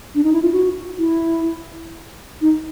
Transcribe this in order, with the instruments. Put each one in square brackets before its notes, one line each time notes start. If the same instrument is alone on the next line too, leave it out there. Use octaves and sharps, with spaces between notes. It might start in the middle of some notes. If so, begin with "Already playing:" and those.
[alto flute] D4
D#4
E4
F4
F#4
E4
D#4